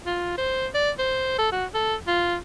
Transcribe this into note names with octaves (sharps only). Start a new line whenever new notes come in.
F4
C5
D5
C5
A4
F#4
A4
F4